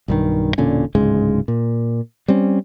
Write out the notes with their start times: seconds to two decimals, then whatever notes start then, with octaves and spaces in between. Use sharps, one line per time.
0.08 B1 G2 D#3
0.58 E1 A#2 D3 C#4
0.95 D1 G#2 C#3 G#3
1.48 A#2
2.28 G3 C4 C#4